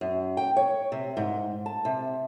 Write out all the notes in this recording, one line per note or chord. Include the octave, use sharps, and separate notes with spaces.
F#2
G5
C#5
C3
G#2
A5
C3